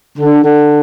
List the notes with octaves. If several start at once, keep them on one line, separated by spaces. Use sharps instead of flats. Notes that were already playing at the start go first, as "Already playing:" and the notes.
D3
D3